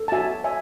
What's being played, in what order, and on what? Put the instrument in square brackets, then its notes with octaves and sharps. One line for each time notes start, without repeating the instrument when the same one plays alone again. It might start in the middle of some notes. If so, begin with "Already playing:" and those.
Already playing: [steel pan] A4
A5
F#4 E5 G#5
C#5 E5 G#5